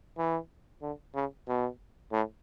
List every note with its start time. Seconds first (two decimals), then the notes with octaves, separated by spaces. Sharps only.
0.18 E3
0.82 D3
1.15 C#3
1.48 B2
2.12 A2